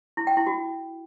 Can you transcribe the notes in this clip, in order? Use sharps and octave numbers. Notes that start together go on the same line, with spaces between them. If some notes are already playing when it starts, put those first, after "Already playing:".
E4
G5
E4
F#4